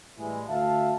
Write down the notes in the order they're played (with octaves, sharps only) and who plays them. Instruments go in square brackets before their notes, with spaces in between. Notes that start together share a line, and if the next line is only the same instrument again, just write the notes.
[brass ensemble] A2 E3 G3 G#3
D2 E5 F5 A5